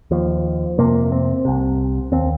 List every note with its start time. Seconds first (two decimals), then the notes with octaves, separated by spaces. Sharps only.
0.11 D#2 F3
0.78 F2 C3 A#3
1.12 C4
1.45 C2 C3
2.12 D#2 C4